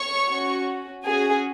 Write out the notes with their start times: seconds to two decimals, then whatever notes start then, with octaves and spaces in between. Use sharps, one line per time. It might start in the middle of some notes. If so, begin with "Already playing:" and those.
Already playing: C#5 C#6
0.29 C#4 F#4
1.05 C#4 F#4 G#4 G#5